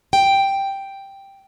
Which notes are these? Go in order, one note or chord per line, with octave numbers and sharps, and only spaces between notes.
G5